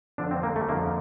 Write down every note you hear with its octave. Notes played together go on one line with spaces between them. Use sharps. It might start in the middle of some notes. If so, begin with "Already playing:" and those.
F2 D3 F3 D4
C4
A#3
A3
F2 D3 F3 A#3